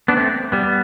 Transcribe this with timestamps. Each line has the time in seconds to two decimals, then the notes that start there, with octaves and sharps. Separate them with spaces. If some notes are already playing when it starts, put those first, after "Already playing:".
0.08 B3 D4
0.17 A3 C4
0.52 G3 B3